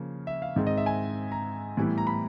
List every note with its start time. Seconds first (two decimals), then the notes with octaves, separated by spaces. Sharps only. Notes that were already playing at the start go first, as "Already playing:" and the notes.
Already playing: C#3 F3 A#3
0.27 E5
0.42 F5
0.56 G#2 D#3 G#3 C4
0.67 D#5
0.77 E5
0.86 G#5
1.32 A#5
1.77 A2 E3 G3 B3
1.98 A#5
2.07 B5